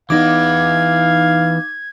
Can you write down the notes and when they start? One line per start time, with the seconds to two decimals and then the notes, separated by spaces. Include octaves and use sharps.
0.10 E3 B3 D#4 F5 D6 G#6